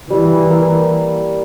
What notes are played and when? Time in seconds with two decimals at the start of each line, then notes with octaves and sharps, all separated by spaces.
0.10 E3 G3
0.50 A#3